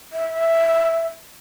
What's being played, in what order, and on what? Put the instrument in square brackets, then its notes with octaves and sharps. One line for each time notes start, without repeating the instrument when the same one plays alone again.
[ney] E5